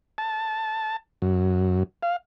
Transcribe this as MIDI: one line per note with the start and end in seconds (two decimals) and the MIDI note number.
0.18 0.97 81
1.22 1.83 42
2.03 2.16 77